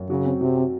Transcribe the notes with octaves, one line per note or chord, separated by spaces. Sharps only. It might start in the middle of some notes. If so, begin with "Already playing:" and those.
Already playing: F#2
C#3 F#3
C4
C3 F#3
C4